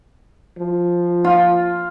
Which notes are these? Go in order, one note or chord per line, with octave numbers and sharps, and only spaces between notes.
F3
F4